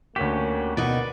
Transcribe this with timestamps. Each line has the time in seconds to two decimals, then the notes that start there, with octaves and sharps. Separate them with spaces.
0.16 D2 A#3 C#4 F#4 G4 B6
0.77 B2 A#3 D#4 F#4 B4 D5